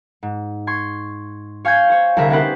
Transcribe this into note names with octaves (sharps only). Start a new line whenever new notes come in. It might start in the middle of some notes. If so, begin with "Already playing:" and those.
G#2
C6 C#6 G#6
C#5 F5 G#5 G6 G#6
C5 C#5
C2 D3 G#4 A#4 E5
B3 C#4 D#4 G4 B4 C5